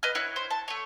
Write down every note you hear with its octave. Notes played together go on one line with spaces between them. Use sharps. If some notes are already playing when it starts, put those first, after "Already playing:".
B4 D#5 F6
E4 C#5 F#6
C5
A5
A3 C#5